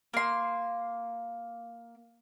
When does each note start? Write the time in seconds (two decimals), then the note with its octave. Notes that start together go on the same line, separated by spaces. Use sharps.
0.14 A#3 C6